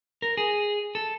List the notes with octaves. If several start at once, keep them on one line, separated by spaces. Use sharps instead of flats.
A#4
G#4
A4